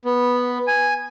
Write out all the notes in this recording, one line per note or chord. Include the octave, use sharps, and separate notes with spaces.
B3
G#5